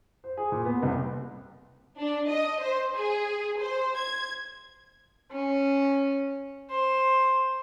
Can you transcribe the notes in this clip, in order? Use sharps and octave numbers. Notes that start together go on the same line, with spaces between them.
C5
G#4
A#2
B3
C2
D4
D#5
C5
G#4
C5
G#6
C#4
C5